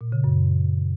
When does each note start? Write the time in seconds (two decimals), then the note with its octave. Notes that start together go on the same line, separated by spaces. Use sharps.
0.01 A#2
0.12 C#3
0.24 F#2